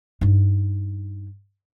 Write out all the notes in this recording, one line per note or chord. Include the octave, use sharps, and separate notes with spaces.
G2 D#4